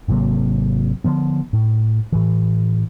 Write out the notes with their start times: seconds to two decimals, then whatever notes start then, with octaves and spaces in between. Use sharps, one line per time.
0.08 G#1 C3 F#3 A#3
1.04 D3 F3 B3
1.53 A2
2.12 A2 E3